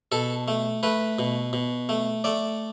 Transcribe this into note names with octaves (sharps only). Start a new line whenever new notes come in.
B2 A4
A3
A3 B4
B2
B2
A3
A3 D5